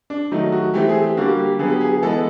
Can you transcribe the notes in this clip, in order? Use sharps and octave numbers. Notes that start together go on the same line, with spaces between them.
D4
D#3 F#3 A3 D#4
F#4
E3 A3 C4 G4
G#4
G4
D3 G3 A#3 F#4
G4
D3 F#3 B3 G#4
G4
G#4
G#4
E3 G#3 B3 A4